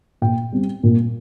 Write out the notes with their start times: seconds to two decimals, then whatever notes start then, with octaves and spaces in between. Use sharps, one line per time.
0.22 A#2 G5
0.52 G3 C4
0.83 A#2